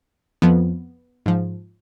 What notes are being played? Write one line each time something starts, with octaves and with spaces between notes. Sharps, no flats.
F2 F3 B3
G#2 F3